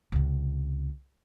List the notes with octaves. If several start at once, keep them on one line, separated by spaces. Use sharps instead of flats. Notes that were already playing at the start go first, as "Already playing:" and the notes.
C#2 C3